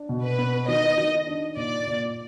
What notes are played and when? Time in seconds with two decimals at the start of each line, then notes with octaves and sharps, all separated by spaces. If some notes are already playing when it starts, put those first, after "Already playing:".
Already playing: D4
0.09 B2
0.24 B4
0.38 B3
0.68 D#3 D#5
0.98 D#3
1.27 D4
1.56 A#2 D5
1.87 A#2